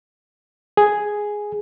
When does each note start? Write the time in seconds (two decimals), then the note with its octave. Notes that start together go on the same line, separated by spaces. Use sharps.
0.77 G#4